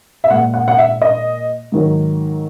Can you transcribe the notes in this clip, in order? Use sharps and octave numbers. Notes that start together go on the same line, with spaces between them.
E5
A#2 G#3 F#5
F#5
F#5
E5
D#5
G#2 D#3 F#3